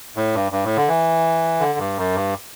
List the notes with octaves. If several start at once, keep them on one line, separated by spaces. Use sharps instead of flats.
A2
G2
G2
A2
D3
E3
D3
G2
F#2
G2